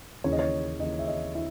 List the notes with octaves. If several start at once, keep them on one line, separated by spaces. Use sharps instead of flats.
D#2 C#3 E3 C#5
D#5
C#5
D#2 C#3 E3 D#5
E5
D#5
E4 E5